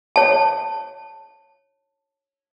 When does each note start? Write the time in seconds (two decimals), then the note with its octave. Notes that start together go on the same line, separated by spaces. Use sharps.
0.16 C#5 A5